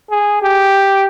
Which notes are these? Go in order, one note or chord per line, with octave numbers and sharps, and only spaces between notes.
G#4
G4